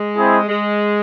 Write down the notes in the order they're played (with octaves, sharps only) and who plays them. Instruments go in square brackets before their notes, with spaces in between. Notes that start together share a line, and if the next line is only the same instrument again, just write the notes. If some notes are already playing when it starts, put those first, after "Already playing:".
Already playing: [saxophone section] G#3
[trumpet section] C4 E4 G#4
[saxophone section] G#3